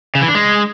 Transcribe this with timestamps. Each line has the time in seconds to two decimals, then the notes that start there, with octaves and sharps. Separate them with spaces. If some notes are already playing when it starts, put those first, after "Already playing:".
0.15 C#3
0.22 E3
0.28 D4
0.35 G#3